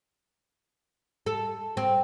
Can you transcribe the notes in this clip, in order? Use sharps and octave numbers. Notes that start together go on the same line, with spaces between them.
A4
C4